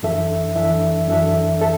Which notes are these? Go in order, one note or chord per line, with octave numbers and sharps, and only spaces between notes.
F#2 E3 D4 A4 E5
F#2 E3 D4 A4 E5
F#2 E3 D4 A4 E5
A4 E5